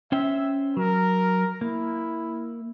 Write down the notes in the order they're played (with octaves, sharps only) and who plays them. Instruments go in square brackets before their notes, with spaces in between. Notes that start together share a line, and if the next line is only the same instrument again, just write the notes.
[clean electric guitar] C#4 C5 G5 [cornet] E5
[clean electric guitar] F#3 [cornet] A#4
[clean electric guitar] A#3 [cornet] E4